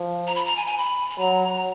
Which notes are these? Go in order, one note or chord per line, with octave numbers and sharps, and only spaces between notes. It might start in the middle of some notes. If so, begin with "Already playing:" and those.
Already playing: F3
A#5
B5
A#5
G#5
G#5
B5
B5
F#3 A#5